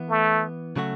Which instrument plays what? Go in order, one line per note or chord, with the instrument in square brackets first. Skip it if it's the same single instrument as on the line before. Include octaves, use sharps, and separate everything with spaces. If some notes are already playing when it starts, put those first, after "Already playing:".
Already playing: [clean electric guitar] E3 B3 E4
[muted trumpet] A3
[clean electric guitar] C#3 F#3 A3 F#4